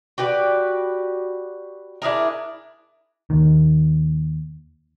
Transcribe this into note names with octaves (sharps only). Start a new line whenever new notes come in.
F#4 G4 B4 D5
D4 E4 G#4 A#4
D#2 D#3